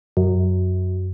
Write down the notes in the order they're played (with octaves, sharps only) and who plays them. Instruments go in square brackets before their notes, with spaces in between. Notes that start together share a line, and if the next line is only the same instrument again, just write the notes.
[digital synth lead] F#2